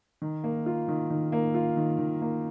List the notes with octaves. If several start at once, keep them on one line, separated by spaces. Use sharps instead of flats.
D#3
A#3
F4
D#3
D#3
A#3
F4
D#3
D#3
A#3